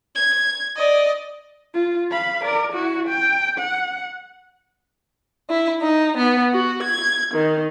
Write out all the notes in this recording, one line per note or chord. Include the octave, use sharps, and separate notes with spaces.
G#6
D5 D#5
F4
F5 B5
A#4 D5
E4 F#4
G5
F#5
E4
D#4
B3
F#4
G#6
D#3